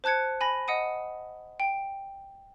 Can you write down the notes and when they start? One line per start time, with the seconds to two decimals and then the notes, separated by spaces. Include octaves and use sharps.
0.04 C5 A5 F#6 G#6 C#7
0.41 G#5 B5 A#6
0.68 D#5 F#5 D#6 D#7
1.60 G5